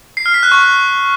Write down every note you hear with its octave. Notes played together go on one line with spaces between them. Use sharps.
C7
F6
B6
F#6
C#6